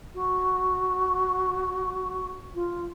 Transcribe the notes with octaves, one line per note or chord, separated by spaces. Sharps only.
F#4
F4